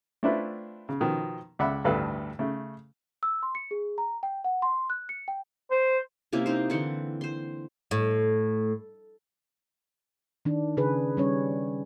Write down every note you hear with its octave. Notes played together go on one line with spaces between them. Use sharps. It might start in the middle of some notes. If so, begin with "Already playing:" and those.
A3 C4 D4 E4 F4 B4
C#3
B2 D#3 F3
C#2 D5 E5 F#5 B5
A1 D2 G2 A4 B4 F5
C#3 A3
E6
C6
C#7
G#4
A#5
G5
F#5
C6
F#6
C#7
G5
C5
C3 A#3 C#4 E4
C4 D#4 C5
D3 E3 C4 F#5
C5 C6
A2
D#3 D4
C#3 G#4 B4
G3 C#4 C#5